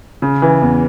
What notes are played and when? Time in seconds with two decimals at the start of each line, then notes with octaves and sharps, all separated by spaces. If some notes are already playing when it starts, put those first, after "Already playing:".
0.22 C#3
0.42 E3
0.62 E2